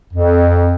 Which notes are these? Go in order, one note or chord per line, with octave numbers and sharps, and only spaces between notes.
F2